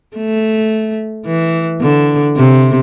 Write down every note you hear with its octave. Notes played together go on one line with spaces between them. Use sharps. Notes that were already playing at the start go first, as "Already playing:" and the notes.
A3
E3
D3
C3